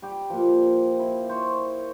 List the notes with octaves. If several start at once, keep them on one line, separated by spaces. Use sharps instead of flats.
G3 G4
A#2 F3
E4
C5 C#5